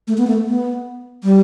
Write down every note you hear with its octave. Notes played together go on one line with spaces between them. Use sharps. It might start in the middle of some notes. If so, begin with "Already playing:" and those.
A3
B3
A3
B3
G3